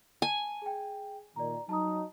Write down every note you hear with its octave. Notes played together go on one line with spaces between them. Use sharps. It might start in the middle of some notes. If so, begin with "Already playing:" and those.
G#5 A5
G#4 G5
A#2 D#3 D5 A#5
F#3 D#4 A5 A#5 D#6